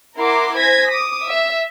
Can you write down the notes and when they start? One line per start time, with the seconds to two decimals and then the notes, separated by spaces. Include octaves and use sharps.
0.17 E4 A#4 F#5 A#5 C6 D6
0.58 C5 G#5 G#6 A#6 B6
0.90 D6 D#6
1.26 E5